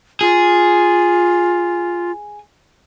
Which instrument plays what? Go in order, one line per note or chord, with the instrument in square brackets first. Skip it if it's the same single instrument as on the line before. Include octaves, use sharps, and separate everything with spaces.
[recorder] F4 [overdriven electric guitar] G#4